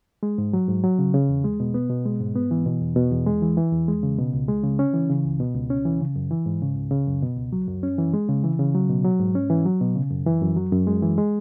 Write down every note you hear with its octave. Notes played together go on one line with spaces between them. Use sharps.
G#3
G#2
F#3
G#2
F#3
C#3
C#3
E2
G#3
B2
B3
B2
G#3
G#2
B3
E3
B2
E2
B2
E2
G#3
E3
E3
E2
G#3
C#3
B2
C#2
G#3
C#3
C#4
E3
C#3
C#2
B2
C#2
C#4
E3
C#3
F#2
E3
G#2
C#3
C#2
C#3
F#2
B2
C#2
F#3
F#2
C#4
E3
G#3
C#3
E3
C#3
F#3
B2
F#3
G#2
C#4
E3
F#3
B2
C#3
F#2
E3
F#2
F#3
F#2
G#3
E3
G#3